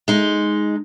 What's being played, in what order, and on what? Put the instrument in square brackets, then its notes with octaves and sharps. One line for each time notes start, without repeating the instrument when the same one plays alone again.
[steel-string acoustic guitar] G#3 D#4